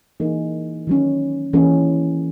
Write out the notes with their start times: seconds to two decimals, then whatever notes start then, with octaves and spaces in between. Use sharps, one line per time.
0.20 E3 A#3 D#4 G#4
0.87 D#3 F#3 C#4
1.53 E3 A#3 C#4 G#4